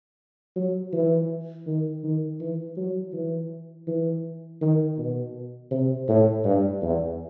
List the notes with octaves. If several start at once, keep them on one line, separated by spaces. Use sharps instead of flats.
F#3
E3
D#3
D#3
E3
F#3
E3
E3
D#3
B2
C3
A2
G2
E2